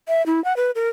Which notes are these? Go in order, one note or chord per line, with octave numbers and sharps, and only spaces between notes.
E5
E4
F#5
B4
A#4